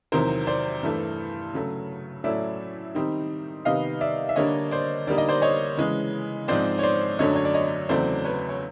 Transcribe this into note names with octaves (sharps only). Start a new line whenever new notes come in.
E2 C3 D#3 F#3 A#4 C5
C5 D5
G2 E3 A3
C#3 F#3 A3
A2 F#3 A3 C#4 E4 D5 E5
D#3 G3 C4 D#4
C3 D#3 G3 B3 D#5 F5
D5 E5
E5
D3 G3 A#3 D4 C#5 D#5
C5 D5
D3 G3 A#3 D#4 D5
D#5
C5 D5
C#5 D#5
C#3 E3 G#3
G#2 F3 G#3 C4 C5 D5
C#5
C5 D5
F#2 D3 F#3 A3 D4 C#5 D#5
C#5
D5
C#5 D#5
E2 C#3 F#3 A3 C4 C5 D5
B4 C#5
C#5